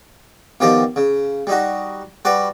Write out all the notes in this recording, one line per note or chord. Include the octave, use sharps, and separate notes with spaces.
B2 D#3 F3 G4 D5
C#3
G3 D#4 F#4
G3 F#4 B4 D5